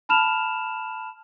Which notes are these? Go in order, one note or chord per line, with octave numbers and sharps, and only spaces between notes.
A5 B5 F6 E7 F7